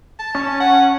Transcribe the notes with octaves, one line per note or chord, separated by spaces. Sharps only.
A5
C#4
F#5